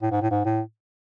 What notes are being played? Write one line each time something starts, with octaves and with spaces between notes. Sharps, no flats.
A2
G#2
A2
G#2
A2